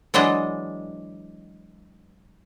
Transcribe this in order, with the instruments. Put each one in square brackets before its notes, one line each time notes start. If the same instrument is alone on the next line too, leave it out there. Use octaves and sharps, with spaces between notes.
[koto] E3 F#3 G#3 D4 D#5